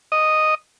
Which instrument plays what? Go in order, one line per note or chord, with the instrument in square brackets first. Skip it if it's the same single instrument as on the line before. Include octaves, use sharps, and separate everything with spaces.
[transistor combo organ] D#5